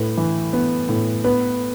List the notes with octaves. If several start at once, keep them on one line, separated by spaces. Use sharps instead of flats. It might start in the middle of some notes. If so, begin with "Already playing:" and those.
Already playing: A2 B4
E3
B3
A2
B3 B4